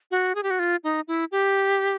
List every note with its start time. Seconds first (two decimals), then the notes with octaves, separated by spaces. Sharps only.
0.11 F#4
0.35 G#4
0.43 G4
0.51 F#4
0.59 F4
0.84 D#4
1.08 E4
1.32 G4